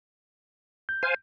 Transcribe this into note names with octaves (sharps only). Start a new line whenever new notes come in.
G6
C5 F5 G#5